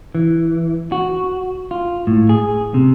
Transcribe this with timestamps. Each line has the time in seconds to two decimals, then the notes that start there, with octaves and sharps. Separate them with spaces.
0.15 E3
0.92 F#4
1.71 F4
2.07 A2
2.29 G#4
2.74 C3